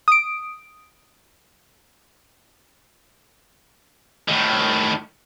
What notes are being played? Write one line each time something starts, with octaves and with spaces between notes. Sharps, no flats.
D#6 D7
A2 D#3